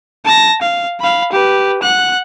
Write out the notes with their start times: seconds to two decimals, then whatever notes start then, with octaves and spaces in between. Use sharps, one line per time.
0.25 A5 A#6
0.61 F5
1.00 F5 B5
1.32 G4 B4
1.82 F#5 F#6